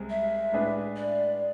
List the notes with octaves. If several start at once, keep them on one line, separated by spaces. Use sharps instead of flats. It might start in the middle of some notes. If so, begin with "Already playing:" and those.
Already playing: C2 C3 G#3 C4 G#4
E5
A2 G#3 D4 G#4 B4
D5